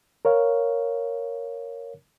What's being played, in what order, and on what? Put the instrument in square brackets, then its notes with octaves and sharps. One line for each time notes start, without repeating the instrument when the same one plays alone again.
[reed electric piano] A#4 C#5 F5